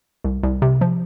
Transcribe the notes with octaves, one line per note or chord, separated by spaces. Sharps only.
C2
C2
C3
F3